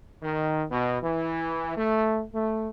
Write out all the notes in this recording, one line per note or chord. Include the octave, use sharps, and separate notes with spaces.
D#3
B2
E3
A3
A3